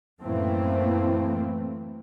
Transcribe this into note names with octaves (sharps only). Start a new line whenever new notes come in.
F#2 A2 E3 A3 A#3 C4